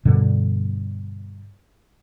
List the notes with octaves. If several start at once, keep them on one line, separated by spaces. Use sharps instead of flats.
G2 B2 D3 G3